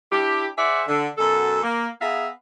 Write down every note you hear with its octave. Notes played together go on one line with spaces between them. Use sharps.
D4 E4 G4
G#4 C5 D5 E5 F#5
D3
F#2 B2 A4
A#3
B3 G#4 E5 F5 A#5